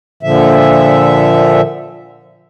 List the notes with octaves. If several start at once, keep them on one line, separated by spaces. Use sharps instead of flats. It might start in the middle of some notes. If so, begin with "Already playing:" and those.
A#2 D3 F3 E5